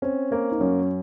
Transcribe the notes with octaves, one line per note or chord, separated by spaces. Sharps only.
C4 C#4
A#3 C4
D#4
F#2 C#4